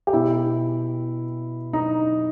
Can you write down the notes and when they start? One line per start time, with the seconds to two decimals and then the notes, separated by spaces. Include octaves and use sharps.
0.07 G4
0.13 B2 E4
1.73 D#4